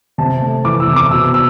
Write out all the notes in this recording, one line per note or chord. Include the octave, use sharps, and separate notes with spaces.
C3 A5
A3
E3 D6
E6
C3
D6
B2 E6
E6